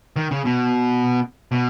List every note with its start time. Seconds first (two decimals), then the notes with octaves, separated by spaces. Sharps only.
0.16 D#3
0.31 C#3
0.45 B2
1.52 B2